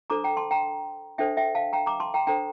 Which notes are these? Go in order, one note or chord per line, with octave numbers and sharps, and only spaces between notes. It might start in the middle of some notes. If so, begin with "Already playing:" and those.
D4 A4 C5 A#5 D6
G5 A#5
A5 C6
G5 A#5
D4 A4 C5 E5 G5
E5 G5
F5 A5
G5 A#5
A#5 D6
A5 C6
G5 A#5
D4 A4 C5 G5 A#5